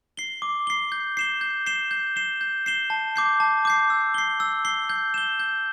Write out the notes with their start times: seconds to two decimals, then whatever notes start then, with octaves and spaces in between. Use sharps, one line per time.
0.17 C7 G7
0.42 D6
0.67 C7 G7
0.92 G6
1.17 C7 E7 G7
1.41 G6
1.66 C7 E7 G7
1.91 G6
2.16 C7 E7 G7
2.41 G6
2.66 C7 E7 G7
2.90 A5
3.16 D6 G6 C7
3.40 A5
3.65 D6 G6 C7
3.90 E6
4.14 C7 G7
4.40 E6
4.65 C7 G7
4.89 G6
5.14 E7 G7
5.40 G6